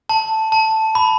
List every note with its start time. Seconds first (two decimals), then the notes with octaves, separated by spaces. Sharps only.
0.09 A5
0.52 A5
0.95 B5